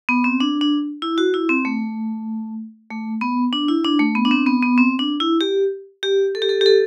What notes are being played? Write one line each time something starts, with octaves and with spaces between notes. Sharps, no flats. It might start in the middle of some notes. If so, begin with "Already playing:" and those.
B3
C4
D4
D4
E4
F#4
E4
C4
A3
A3
B3
D4
E4
D4
A3
B3
D4
C4
B3
B3
C4
D4
E4
G4
G4
A4
G4
A4
G4
A4